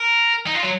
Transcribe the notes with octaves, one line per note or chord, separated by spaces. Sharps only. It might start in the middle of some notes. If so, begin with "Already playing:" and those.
Already playing: A#4
D#4
F4
F#3